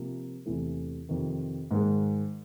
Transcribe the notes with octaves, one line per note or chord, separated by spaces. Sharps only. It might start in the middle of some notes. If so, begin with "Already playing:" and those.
Already playing: C3 F3 A#3
E2 C3 E3 A3
F2 C3 D#3
G#2 D#3 G#3